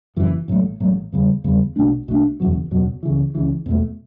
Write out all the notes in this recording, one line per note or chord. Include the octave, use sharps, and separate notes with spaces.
F#1 F#2 E3
A1 A2 F#3 A3
A1 A2 F#3 A3
E2 C#3 G3
E2 C#3 G3
B1 B2 A3 D4
B1 B2 A3 D4
F#1 E2 B2 F#3
F#1 E2 B2 F#3
C#2 C#3 E3
C#2 C#3 E3
E2 B2 A3